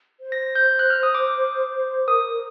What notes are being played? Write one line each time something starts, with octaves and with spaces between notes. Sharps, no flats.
C5
A#6
G6
F#6
F6
D#6
D6
A#4 D#6